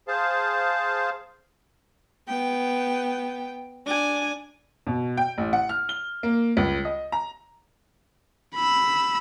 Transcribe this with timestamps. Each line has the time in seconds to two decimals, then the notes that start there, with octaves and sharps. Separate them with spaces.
0.08 G#4 C5 F5 A5
2.29 B3 G5
3.87 D4 G#5
4.87 B2
5.17 G5
5.38 A1
5.53 F#5
5.69 F6
5.89 G7
6.23 A#3
6.57 C#2
6.85 D#5
7.12 A#5
8.56 B5 E6